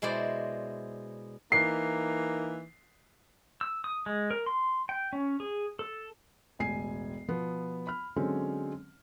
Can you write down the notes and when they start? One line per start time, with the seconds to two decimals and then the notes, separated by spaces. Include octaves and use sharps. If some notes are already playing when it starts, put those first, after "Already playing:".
0.02 B2 G#3 E4 C5 D5
1.52 E3 A#3 D#4 C7
3.61 E6
3.84 D#6
4.06 G#3
4.31 A#4
4.46 C6
4.89 G5
5.13 C#4
5.40 G#4
5.79 A4
6.59 E1 A1 G#5 C7
7.28 B2 F3 B3
7.87 B5 F6
8.16 D3 F#3 G#3 C4 C#4